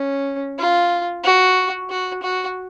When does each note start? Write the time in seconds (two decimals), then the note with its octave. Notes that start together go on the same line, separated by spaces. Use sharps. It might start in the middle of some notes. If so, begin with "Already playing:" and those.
Already playing: C#4
0.58 F4
1.24 F#4
1.90 F#4
2.23 F#4